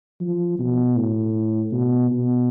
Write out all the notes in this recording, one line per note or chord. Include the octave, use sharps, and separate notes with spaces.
F3
B2
A2
B2
B2